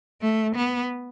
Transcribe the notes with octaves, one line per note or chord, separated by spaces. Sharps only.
A3
B3